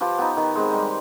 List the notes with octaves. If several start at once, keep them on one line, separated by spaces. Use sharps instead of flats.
F3 G4 B4
B3 D#4
D#3
G#3 C4
G3